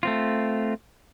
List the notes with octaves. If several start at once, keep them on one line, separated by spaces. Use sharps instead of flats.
A3 C4 F4